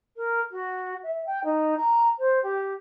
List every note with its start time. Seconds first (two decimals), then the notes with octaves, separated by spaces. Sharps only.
0.16 A#4
0.51 F#4
1.03 E5
1.26 G5
1.44 D#4
1.77 A#5
2.18 C5
2.43 G4